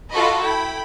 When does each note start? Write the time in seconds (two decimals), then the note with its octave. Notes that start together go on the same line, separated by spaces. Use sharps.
0.11 F4 F#4 A4 D#5 B5
0.42 E4 G5 B5